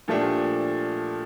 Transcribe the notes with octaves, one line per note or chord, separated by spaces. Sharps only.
A#2 F3 A3 D4 G4